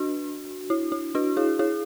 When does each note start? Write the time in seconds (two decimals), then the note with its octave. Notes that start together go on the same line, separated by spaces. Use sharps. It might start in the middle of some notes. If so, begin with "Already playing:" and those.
Already playing: D4 F#4
0.70 E4
0.92 E4
1.15 D4 F#4
1.37 E4 G#4
1.59 E4 G#4